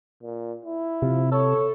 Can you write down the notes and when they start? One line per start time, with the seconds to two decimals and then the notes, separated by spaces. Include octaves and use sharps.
0.23 A#2
0.65 E4
1.02 C3 F3
1.32 A4 C#5